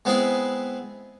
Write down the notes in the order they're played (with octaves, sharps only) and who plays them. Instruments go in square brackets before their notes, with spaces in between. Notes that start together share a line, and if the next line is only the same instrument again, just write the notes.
[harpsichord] G#3 B3 C4 E4 G#4